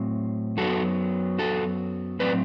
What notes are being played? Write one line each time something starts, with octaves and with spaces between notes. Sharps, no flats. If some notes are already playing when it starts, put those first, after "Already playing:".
Already playing: A2 F#3 C4
F#2 F#3 B3 F#4 A4
F#4 A4
A2 F#3 C4 B4 D5